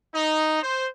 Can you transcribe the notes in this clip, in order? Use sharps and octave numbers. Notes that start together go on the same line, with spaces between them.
D#4
C5